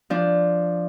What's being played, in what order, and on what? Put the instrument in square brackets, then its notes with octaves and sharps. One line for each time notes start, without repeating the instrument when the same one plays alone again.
[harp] F3 D4